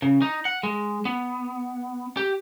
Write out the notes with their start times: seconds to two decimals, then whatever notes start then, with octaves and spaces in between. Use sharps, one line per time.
0.02 C#3
0.22 D#4
0.45 F#5
0.63 G#3
1.05 B3
2.17 G4